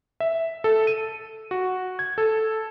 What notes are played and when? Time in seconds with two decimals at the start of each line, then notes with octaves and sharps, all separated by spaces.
0.20 E5
0.64 A4
0.87 D#7
1.51 F#4
1.99 G#6
2.18 A4